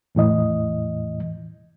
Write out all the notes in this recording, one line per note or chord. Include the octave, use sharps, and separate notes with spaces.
E2 A2 E3 D#5